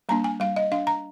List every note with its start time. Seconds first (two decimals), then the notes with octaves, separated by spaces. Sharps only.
0.09 G3 A#3 D4 A#5
0.24 G#5
0.40 G3 F5
0.56 D#5
0.72 D4 F5
0.87 A#5